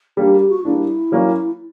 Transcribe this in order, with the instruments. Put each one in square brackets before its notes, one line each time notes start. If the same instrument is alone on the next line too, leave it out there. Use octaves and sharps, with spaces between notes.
[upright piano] G3 A#3 D4 [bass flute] G4
[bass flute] G4
F#4
[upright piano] G3 A#3 D4 [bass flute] E4
[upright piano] F#3 A#3 C#4